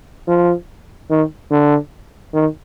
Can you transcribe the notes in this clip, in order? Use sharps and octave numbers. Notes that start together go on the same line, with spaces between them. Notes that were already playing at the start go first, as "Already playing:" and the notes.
F3
D#3
D3
D#3